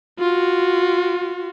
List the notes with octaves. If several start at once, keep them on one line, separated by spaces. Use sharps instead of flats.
F4 F#4